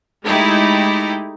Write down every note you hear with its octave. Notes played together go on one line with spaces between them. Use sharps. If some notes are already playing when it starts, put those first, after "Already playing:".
G#3 A3 D#4 E4 G4